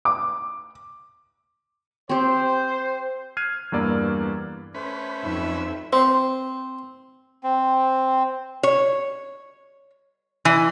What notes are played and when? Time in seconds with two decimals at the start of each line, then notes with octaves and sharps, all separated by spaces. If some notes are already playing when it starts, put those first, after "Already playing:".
0.05 D6
2.09 C4 G4 C5
3.37 F6 F#6 G#6 C7 D#7
3.72 E2 G2 A#3 D5 E6
4.74 A3 C#4 B4 C5
5.24 F2 D#4 E5
5.93 C4 C5
7.44 C4
8.63 C#5
10.45 E3